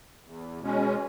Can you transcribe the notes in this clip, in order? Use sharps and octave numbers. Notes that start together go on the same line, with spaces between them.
E2
B2 G#3 C#4